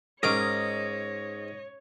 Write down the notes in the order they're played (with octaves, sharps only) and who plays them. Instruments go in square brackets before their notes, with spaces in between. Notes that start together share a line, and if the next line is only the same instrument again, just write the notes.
[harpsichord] G#2 D6 [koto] C#4 G#4 A#4 [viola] C#5 [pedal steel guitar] D#5